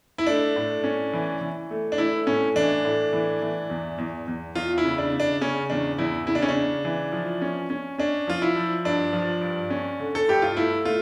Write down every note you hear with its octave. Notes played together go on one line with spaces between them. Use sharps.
E4
A3 D4
A2
C#4
E3
E3
A3
D4
A3 E4
A2 C#4
E3 D4
A2
E3
E3
E2
E2
E2
E2 F4
E4
C#3
D4
C#3
D4
C#3 C#4
E2 D4
E2 E4
C#3 E4
D4
C#4
D4
C#3
E3
F3
C#4
C#4
C#4 D4
F3 F4
E4
F3
G2 D4
F3
G2
C#4
D3
A4
G2 G4
F4
A3 E4
A3 F4